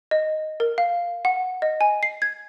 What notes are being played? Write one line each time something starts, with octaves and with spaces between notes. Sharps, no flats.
D#5
A#4
F5
F#5
D#5
G#5
C7
G#6